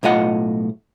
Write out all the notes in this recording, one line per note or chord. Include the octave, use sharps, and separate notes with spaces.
B1 A2 F4 D#5 F#5